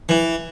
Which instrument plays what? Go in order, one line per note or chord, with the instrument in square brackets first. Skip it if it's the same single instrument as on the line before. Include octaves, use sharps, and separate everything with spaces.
[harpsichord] E3